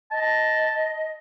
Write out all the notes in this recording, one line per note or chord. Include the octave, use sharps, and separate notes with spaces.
D#5 A5